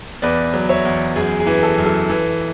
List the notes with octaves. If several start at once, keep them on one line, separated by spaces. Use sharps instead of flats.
E2 B4 D5
F#3
C#5 E5
E2
F#2 G#4
G#4
E3
A4
F#2
A4
E3